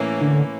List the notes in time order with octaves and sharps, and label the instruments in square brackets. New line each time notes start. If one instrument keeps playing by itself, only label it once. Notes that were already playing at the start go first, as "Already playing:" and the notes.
Already playing: [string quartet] A2 E3 A#3 C#4
[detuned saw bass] D3